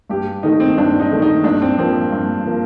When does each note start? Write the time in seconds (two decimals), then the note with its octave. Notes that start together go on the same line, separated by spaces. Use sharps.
0.10 G2 G4
0.43 D#3 A3 D#4
0.60 C4
0.78 G2 D4
1.00 D#4
1.11 D#3 A3
1.22 D#4
1.44 G2 D4
1.62 C4
1.78 F3 A#3 C4
2.12 G2
2.46 F3 A#3